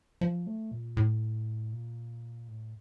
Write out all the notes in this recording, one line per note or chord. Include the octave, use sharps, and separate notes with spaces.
F3
A3
A#2
A2
A#2
A2